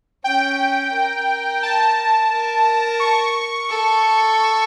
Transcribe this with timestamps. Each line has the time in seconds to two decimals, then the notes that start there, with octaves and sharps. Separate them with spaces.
0.24 C#4 G5
0.93 A#4
1.63 A5
2.31 A#4
3.00 C#6
3.69 A4